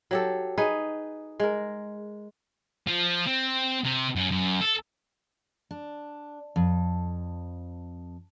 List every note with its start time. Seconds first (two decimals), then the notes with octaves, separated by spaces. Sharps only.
0.11 F#3 G4 A4
0.58 D#4 G#4 B4
1.40 G#3 A#4
2.87 F3
3.27 C4
3.85 C3
4.16 F#2
4.31 F#2
4.61 A4
5.71 D4
6.56 F2